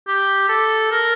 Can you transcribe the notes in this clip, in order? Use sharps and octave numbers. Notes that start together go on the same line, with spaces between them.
G4
A4
A#4